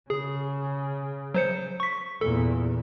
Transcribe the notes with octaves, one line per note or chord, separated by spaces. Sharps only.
C#3 G#4
F#3 C5 C#7
C#6 B6
E2 A#2 A4